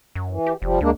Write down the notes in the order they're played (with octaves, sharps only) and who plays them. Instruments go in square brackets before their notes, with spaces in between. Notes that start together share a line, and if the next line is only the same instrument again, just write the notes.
[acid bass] F#2
[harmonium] E3
[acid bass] G4
[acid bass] F1 [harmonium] F3 G3
[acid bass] D2 [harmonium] G#3 A#3 D4